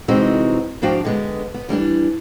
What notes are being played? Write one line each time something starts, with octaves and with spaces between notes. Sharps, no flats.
C3 E3 G#3 C4 D#4 F#4
G#2 F3 D4 F#4 F5 G5
D3 G#3 B3
B3
E3 G3 C#4 D4